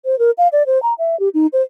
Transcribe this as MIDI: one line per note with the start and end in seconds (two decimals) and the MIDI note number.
0.05 0.18 72
0.19 0.31 70
0.38 0.48 77
0.52 0.63 74
0.66 0.81 72
0.83 0.94 82
0.99 1.18 76
1.20 1.29 67
1.34 1.47 63
1.53 1.62 72